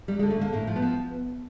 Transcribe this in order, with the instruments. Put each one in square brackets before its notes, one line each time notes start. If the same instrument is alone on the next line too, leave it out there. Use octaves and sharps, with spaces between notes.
[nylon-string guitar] F#3 G3
G#3
D3
A3
D3 A#3
A2 A#3
F3
B3
F3